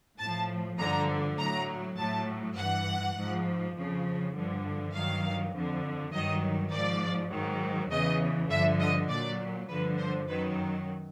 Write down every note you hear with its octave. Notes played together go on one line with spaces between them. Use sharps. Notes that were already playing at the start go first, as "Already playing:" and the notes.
A2 F3 A5
G2 D3 F3 A#5
A2 F#3 A#5
A2 F#3 A5
G2 E3 F#5
G#2 F3
F2 C#3 F3
G2 D3 F3
G2 D#3 F#3 F5
F2 D3 F3
G2 D#3 F#3 D#5
G#2 F3 D5
G#2 D#3 F#3
E2 C#3 E3 D#5
G2 D3 F3 E5
D#5
A#2 F#3 D5
G2 D3 F3 B4
C5
F#2 D#3 F#3 B4